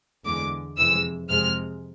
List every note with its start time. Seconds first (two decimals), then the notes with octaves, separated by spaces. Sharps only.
0.25 E2 D3 G#3 D6
0.78 F2 C3 E3 G#3 E6
1.29 F2 C3 G#3 F6